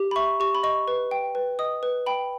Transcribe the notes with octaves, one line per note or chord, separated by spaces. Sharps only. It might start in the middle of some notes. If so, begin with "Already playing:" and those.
Already playing: G4
B5
E5 C#6
G4 C#6
B5
D#5 C#6
B4
G5
B4
D#5 D#6
B4
G5 B5